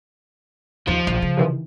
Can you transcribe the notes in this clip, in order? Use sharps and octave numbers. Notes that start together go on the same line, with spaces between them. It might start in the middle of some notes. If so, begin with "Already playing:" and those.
D#2 F3
A#1
C#3
C3 D#3 E3